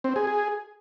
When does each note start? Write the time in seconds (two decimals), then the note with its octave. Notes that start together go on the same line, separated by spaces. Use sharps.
0.04 C4
0.16 G#4
0.27 G#4